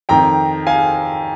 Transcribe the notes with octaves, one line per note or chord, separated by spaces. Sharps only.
F2 D#3 G5 A#5
F5 G#5